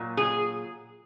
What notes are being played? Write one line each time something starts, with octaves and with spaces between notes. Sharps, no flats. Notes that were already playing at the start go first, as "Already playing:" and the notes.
Already playing: A#2 F#3
G#4